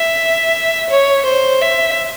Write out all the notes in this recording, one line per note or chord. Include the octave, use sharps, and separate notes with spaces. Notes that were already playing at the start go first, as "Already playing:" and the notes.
Already playing: E5
C#5
C5
E5